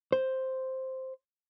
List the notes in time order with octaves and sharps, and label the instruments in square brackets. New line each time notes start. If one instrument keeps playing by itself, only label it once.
[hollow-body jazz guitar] C5